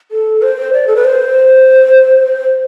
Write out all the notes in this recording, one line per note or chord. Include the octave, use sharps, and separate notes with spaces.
A4
C5
D5
A4
B4
C5